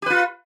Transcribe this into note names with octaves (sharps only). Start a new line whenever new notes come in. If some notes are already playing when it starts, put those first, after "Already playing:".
F4 G4 B4